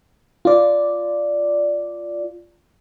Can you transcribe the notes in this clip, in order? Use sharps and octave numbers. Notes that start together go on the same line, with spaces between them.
F4 D5